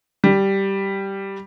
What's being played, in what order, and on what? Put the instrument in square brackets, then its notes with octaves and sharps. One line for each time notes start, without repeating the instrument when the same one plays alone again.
[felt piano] G3